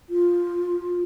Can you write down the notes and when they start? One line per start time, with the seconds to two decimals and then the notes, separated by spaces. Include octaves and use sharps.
0.10 F4